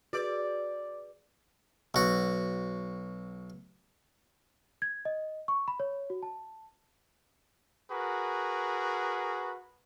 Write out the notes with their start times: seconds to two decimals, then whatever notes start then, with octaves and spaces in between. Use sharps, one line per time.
0.13 F#4 G#4 B4 D5
1.94 B1 F#4
4.82 G#6
5.05 D#5
5.48 C#6
5.68 B5
5.80 C#5
6.10 F#4
6.23 A5
7.91 F#4 G#4 A#4 B4